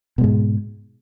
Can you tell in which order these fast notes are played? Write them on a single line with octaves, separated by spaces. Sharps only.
B2 G#3 G#2